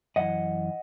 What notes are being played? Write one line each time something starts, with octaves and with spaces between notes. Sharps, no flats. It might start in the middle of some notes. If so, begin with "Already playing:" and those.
F#2 E3 D#5 F#5